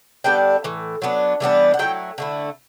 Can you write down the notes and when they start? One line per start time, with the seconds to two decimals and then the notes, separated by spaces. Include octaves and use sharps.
0.24 D3 G3 B3 D4 G5
0.64 A2 E3
1.02 F#3 B3 D4
1.40 E3 G3 B3 D4
1.74 F#5
1.79 F#3 A3 E4 G5
2.18 D3 A3 E4